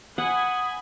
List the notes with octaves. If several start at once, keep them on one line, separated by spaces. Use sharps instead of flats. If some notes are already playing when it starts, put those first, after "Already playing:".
F#5 G#5 B5 D#6